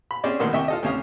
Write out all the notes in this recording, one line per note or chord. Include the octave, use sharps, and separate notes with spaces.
B5
C4 C#4 G#4 D5 D#5
A#1 A2 D#3 A#3 F#5 C6
D#2 C3 D#5 E5 G5 C#6
F4 A4 D#5
D2 C3 C#4 F5 D#6